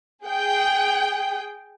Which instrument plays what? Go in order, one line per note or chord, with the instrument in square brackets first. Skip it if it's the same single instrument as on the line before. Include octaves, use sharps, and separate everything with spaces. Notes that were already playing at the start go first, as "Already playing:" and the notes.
[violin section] G#4 G5